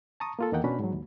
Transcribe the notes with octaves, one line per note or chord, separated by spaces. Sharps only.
A5 A#5 C#6 D#6
A#3 F4 A4
E2 D#3 A#3 D#5 F#5 G5
B2 C#4 D4 F#4 B5
G#2 F#3
D#2